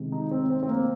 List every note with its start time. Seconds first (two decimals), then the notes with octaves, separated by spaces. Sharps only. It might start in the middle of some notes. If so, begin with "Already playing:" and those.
Already playing: C3 D#3 G#3
0.12 D#4
0.31 C4
0.50 C4
0.63 C4
0.69 A#3